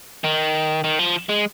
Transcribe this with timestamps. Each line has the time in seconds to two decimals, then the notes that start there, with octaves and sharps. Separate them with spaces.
0.24 D#3
0.84 D#3
0.99 F3
1.29 G#3